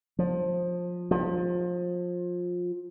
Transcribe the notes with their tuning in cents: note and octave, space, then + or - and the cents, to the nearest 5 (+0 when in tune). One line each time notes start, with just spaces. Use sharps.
F3 +20
F3 +25